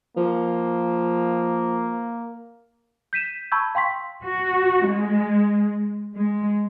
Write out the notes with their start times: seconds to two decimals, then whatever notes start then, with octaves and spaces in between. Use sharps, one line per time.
0.17 F3 A#3
3.13 G6 B6 D#7 E7
3.52 A5 B5 C#6 E6 G6 G#6
3.75 F5 G5 C6 C#6 B6
4.23 F#4
4.86 G#3
6.14 G#3